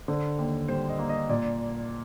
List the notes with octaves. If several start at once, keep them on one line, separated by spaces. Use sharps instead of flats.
D3 C5
D#2
G3 C5
D#5
A#3
D#5
A#2 D5